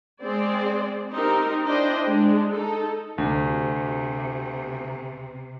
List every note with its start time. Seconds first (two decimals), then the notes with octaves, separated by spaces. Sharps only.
0.21 G#3 C4 G#4 D5
1.12 C4 D#4 G4 A#4
1.65 D4 E4 C5 D5 D#5 G5
2.06 G#3 D4
2.52 D#4 A4
3.18 D2 C3